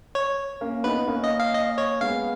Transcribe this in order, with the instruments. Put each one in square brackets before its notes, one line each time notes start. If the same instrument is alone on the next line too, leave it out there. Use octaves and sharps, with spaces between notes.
[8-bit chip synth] C#5
[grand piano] A#3 C#4
[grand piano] B3 D#4 [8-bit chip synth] B4
[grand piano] A#3 C#4
[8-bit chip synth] D#5
F5
D#5
C#5
[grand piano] G#3 B3 [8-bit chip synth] F5